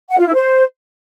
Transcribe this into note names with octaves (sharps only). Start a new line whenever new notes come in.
F#5
F4
E4
C5